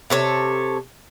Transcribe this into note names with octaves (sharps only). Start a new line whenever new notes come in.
C3 A4 C#5